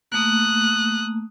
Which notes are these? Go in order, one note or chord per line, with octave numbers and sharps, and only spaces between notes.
A3 A#3 D#6 F#6